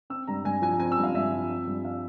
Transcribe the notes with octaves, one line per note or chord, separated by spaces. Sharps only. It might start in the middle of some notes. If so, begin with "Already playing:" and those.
C4 E6
G2 A#5
G2 G#5
F3 G#5
C4 G#5
E6
G2
F5
G2 E5
F3
C4
G2
F5